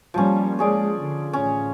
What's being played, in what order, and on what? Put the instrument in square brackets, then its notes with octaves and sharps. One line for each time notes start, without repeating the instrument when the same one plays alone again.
[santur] F3 C#4 [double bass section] G3 A#3
[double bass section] G#3 [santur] C#4 G#4 D5
[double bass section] D3
[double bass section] A1 [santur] C#4